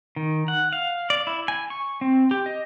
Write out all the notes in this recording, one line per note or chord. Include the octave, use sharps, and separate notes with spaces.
D#3
F#5
F5
D5
E4
G#5
C#6
C4
G4
D#5